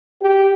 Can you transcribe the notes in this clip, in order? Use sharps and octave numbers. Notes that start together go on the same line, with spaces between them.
G4